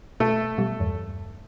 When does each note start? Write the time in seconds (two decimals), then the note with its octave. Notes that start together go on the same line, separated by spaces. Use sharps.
0.20 B2 A3
0.58 B2 G3
0.80 E2 G2